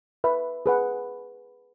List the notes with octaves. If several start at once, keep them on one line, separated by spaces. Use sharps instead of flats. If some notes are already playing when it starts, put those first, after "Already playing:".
B4 E5 B5
G#4 B4 F#5